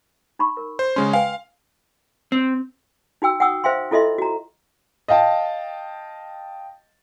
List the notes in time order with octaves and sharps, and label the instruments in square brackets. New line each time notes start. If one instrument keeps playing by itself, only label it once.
[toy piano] D#4 B5 C#6
A#4
[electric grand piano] C5
[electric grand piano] C#3 G#3 C#4 [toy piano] C6
[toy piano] B4 G5 G#5 [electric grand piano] F5
[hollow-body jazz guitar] C4
[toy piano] D#4 F#4 G5 E6
F#5 G5 C#6 D#6 E6
C5 E5 F5 G5 C6
E4 F4 A4 D#5 E5 C6
F#4 A#5
[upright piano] D#5 F5 G5 A5